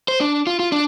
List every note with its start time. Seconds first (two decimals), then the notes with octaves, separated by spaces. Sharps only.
0.08 C5
0.20 D4
0.47 F4
0.59 F4
0.72 D4